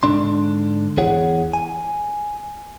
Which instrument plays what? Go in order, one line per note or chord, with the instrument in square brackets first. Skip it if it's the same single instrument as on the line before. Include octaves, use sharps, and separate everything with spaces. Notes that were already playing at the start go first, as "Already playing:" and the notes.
[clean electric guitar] G#2 D3 D4 C6
E2 E4 G#4 C#5 F#5
G#5